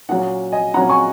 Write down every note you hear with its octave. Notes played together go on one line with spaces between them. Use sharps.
A#2 F#3 C#4 F#5
D#5 G#5
A#2 F#3 C#4 F#5 A#5
G#5 C#6